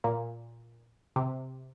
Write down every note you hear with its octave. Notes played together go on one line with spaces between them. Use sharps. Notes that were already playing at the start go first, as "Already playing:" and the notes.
A#2
C3